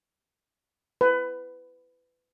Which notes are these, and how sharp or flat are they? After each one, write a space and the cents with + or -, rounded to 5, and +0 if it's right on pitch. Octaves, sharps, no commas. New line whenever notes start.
B4 +25